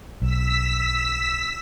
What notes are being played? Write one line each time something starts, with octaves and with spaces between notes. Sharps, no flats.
B1 E6 B6